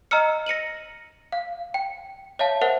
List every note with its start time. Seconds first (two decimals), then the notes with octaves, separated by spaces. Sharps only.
0.11 D#5 A#5 E6 F6 C#7
0.46 A#6 C#7 D#7 F#7
1.32 F5
1.74 G5
2.39 C#5 E5 F5 A5
2.62 A#4 C5 E5 F#5